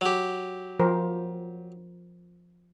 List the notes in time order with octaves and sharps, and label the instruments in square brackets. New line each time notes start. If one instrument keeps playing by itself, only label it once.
[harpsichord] F#3 G4
[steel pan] F3 A#4 C5